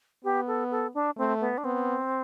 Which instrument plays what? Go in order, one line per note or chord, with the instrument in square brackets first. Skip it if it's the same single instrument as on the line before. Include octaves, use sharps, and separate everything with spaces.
[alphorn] B3 [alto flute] G4
[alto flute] A4
A4
D4
[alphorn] A3 [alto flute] C4
[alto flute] B3
D4
[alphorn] B3 [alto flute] C4